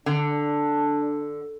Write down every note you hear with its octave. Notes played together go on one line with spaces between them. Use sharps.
D3 D4